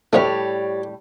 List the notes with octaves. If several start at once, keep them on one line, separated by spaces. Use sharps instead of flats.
D2 A2 F3 G3 A3 G4 C#5 D5